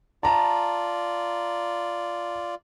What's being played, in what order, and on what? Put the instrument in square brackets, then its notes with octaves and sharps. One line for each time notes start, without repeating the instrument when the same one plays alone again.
[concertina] F4 D5 [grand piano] A5 A#5